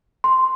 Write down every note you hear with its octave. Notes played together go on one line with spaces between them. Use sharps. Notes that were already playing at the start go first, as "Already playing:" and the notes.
C6